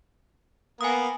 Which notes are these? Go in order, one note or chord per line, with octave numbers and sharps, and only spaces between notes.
A#3 B3 G#5 D#6